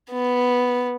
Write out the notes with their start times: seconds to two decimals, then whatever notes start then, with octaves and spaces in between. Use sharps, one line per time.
0.12 B3